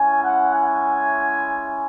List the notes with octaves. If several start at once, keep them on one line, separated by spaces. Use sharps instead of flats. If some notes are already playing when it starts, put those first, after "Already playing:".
Already playing: G#3 C#4 E4 G#5
F#5
G#5